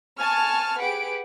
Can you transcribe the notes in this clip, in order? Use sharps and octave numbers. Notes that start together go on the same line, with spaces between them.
G#5 A5 C#6 F6
G4 G#4 B4 F#5 D7